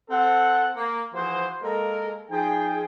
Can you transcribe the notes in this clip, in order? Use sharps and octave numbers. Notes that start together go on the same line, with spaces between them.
C4 A4 F#5
A#3
E3 F3 F#4 G#4 C5
G#3 A#3 A4 A#4
F3 D#4 G#4 G5